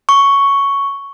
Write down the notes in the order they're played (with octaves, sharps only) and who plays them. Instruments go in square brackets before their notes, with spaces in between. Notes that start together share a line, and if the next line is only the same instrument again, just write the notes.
[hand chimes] C#6